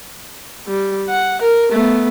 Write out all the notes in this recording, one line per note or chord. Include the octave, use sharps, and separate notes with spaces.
G3
F#5
A#4
A3 B3